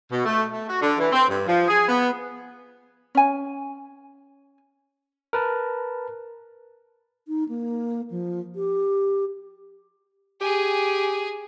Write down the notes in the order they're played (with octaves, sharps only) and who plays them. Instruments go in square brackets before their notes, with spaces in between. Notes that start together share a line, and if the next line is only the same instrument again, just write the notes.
[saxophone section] B2
A3
A3
F#4
D3
E3
C4
G2
F3
G#4
B3
[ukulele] C#4 G#5
[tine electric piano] A#4 B4 A5
[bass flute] D#4
A#3
F3
G4
[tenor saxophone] G4 [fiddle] G#4 G#5